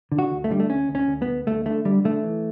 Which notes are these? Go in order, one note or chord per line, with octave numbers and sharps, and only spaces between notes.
D3
F#4
D2
A3
D3 G3
A3
D2 C#4
D2
C#4
D2
B3
D2
D2 A3
D3 A3
D3 G3
D3 A3
E3